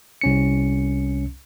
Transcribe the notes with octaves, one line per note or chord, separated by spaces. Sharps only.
C2 C#4 C#7